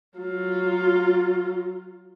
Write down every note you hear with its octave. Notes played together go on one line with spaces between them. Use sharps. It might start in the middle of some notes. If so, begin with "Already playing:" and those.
F#3 F4